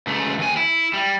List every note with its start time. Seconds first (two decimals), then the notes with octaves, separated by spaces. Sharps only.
0.07 C#2 A3
0.39 D#2 G#5
0.56 E4
0.93 G3